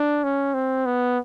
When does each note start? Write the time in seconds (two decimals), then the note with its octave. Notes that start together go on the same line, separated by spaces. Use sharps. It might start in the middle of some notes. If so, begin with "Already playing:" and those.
Already playing: D4
0.24 C#4
0.54 C4
0.86 B3